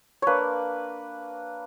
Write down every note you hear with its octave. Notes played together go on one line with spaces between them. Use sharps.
A#3 D4 B4 C#5